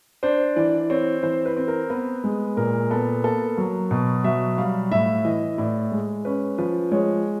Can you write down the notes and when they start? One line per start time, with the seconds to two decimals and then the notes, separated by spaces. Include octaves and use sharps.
0.23 D4 C5
0.56 E3 D5
0.90 C4 C#5
1.23 E3 C5
1.45 B4
1.57 C4
1.68 A#4
1.90 B3 B4
2.24 G#3
2.57 A#2 A#4
2.91 B3 A4
3.24 A#3 A4
3.58 F#3
3.91 B2
4.24 F#3 E5
4.58 G3 F5
4.91 A2 E5
5.25 E3 D#5
5.58 A2 D5
5.92 G#3
6.25 C#4 B4
6.58 F3 B4
6.91 G#3 C#5